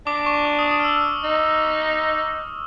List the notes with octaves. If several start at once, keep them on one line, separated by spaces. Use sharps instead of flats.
D4 D6
C#6
D6
D#6
D#6
F6
E6
D#4